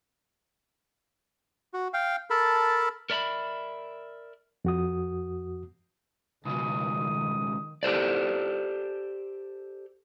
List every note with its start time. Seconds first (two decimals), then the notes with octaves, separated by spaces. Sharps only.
1.74 F#4
1.94 F5 G5
2.30 A4 A#4 A5 B5
3.10 A#4 D5 E5 A#5 B5
4.65 F2 F#4 D#6
6.46 C#2 B2 D#3 D#6
7.83 G4 A4 C5 D5